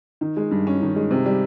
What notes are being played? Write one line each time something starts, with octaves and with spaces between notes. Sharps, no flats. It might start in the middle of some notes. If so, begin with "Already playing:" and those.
D#3
G#3
G2
C#4
D#3
G#3
C3
G3